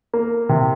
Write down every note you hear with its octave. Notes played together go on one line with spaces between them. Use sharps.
A#3
C3